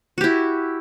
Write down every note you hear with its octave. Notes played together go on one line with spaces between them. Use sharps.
E4 F#4 G4